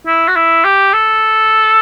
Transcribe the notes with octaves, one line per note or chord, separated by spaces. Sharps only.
E4
F#4
E4
G4
A4